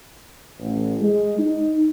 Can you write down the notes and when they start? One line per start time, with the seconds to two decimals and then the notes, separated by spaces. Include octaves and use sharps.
0.59 A1
1.00 G#3
1.38 D#4